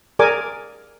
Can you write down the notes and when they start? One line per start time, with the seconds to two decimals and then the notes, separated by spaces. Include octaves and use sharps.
0.19 G#4 A#4 D5 G#5 D6